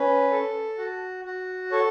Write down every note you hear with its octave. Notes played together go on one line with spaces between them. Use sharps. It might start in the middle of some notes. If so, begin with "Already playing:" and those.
Already playing: C#4 B4
A4
F#4
F#4
A4 C#5